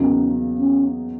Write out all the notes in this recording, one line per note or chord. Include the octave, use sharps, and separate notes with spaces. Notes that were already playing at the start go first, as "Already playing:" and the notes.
Already playing: E2 C#3 F#3 A#3 C#4 D#4
C#4